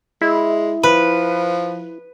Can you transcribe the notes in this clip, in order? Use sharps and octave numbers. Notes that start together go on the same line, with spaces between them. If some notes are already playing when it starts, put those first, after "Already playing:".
G#3 E4
F3 B4